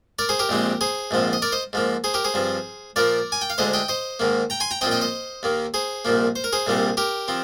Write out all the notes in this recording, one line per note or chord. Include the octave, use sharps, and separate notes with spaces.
A#4 D5
G#4 C5
G4 A#4
A#1 A#2 G#3 C4
G#4 C5
A#1 G#2 F3 C4
D#5
A#4 D5
C5 D#5
G#2 F3 A#3
G#4 C5
G4 A#4
G#4 C5
G2 F3 C4
A#2 F3 A#3 A#4 D5
G#5
G5
F5
D2 D3 G#3 C5 D#5
D#5 G5
C5 D#5
G#2 D#3 A#3
G5 A#5
G#5 C6
G5 A#5
A#2 F3 C4 D#5 G5
D#5 G5
C5 D#5
D#2 D#3 A#3
G#4 C5
C2 A#2 F3 A#3
C5
A#4
G#4 C5
C2 A#2 G3 C4
G4 A#4
F3 C4